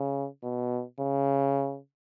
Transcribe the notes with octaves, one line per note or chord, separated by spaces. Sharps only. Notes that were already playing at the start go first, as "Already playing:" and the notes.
Already playing: C#3
B2
C#3